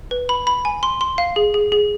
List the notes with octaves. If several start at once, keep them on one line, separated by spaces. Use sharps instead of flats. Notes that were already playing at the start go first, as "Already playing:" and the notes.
B4
B5
B5
G#5
C6
C6
F5
G#4
G#4
G#4